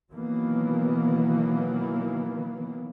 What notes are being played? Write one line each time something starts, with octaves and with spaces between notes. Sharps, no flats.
B2 D#3 E3 F#3 A#3 B3